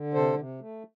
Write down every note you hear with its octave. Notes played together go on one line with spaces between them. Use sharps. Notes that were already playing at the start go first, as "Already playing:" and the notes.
Already playing: D3
C3 A4 C5
C3
A3